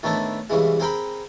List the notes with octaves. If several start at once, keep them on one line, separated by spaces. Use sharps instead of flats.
A2 D#3 A3 B3 D4 E4
C2 C#3 E3 G#3
C4 G#4 A#4 G5 B5